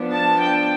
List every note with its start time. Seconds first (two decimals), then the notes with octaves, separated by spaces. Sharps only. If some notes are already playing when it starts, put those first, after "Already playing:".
Already playing: F3 B3 D4
0.11 A5
0.41 G5